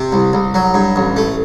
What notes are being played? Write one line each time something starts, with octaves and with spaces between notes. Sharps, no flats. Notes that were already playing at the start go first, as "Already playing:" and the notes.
Already playing: C3
C2
C2
F#3
G2
A1
A3